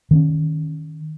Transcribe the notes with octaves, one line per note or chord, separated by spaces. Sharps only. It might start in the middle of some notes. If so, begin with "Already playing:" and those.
D#3 C4 C#4